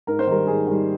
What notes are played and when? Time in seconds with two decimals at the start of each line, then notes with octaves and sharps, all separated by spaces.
0.07 G#2 A#4
0.19 C5
0.27 D#3 G3 A#4
0.47 G#2 G#4
0.67 D#3 G3